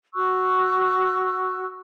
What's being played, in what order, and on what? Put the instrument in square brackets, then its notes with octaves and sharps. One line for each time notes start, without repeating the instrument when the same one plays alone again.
[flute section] F#4 C#6 E6 F#6